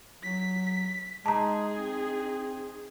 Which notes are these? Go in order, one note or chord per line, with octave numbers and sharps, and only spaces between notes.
F#3 B6
G#3 D#4 G#4 A5 A#5
C4